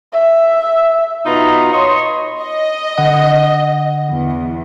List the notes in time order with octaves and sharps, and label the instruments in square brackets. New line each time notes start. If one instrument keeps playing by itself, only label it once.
[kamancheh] E5
[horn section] B2 B3 D#4 F4 A#5 B5
C#5 D#5 C6
[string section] D#5
[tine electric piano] D3 F#5
[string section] E2